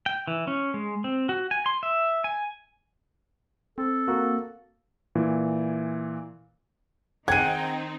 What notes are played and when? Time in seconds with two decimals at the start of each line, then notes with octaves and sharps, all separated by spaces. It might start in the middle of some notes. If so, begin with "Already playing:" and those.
0.06 G5
0.27 E3
0.47 C#4
0.74 G#3
1.04 C4
1.29 F#4
1.51 G#5
1.66 C6
1.83 E5
2.24 G#5
3.78 C4 A4
4.08 A#3 F#4
5.15 A#2 E3
7.28 D#3 C4 D#4 G#4 F#5 G5 G#6 D#7